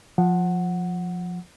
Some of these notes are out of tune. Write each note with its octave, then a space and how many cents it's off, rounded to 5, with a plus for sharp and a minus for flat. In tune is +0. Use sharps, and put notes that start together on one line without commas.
F3 +15 F#5 +0